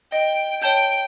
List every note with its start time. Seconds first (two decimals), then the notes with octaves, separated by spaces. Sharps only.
0.12 D#5 G5
0.62 C#5 G5 A5 G6